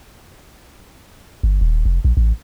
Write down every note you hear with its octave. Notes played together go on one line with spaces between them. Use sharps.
G1
D#1
F1
A#1
A1